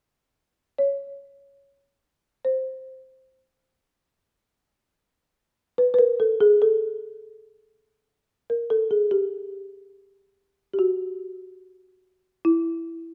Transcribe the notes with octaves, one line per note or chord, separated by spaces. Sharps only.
C#5
C5
B4
B4
A#4
A4
G#4
A4
A#4
A4
G#4
G4
G4
F#4
E4